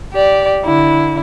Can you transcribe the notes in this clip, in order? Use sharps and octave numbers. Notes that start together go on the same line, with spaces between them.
G4 D5
D3 E4